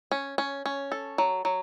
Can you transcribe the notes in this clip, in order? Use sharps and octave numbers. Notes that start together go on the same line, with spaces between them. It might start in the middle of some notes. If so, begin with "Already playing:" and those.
C#4
C#4
C#4
A4
F#3
F#3